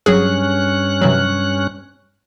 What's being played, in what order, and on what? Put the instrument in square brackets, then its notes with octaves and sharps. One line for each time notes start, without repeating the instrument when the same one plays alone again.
[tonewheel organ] G2 C#4 F#6 [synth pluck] F#3 G#4
[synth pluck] C3 E3 F#3